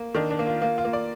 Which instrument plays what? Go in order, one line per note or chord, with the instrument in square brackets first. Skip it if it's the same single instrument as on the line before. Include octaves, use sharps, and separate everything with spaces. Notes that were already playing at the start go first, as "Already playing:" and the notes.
Already playing: [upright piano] A#3
D#3 D4
D4
A#3
F4
A#3 F4
F4
A#3
D5